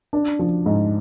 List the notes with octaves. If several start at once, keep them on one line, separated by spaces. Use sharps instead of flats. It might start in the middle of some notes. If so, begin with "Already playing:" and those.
D4
F3
G#2